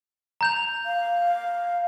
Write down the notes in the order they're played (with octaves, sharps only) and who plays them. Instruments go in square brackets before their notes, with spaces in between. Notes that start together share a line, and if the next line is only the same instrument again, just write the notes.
[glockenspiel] A#5 G6 F7
[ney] F5